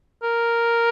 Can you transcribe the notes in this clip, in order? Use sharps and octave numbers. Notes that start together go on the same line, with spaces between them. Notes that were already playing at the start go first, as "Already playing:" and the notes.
A#4